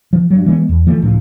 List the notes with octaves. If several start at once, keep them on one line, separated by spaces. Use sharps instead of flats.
F3
G2 F#3
E3 G#3 A#3 B3
E2
E3 F3 A3
C#2 A2 F3